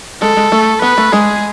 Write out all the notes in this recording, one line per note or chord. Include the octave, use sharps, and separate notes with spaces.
G#3 A4
G#3
A3
B3 B4
A3
G#3 G#4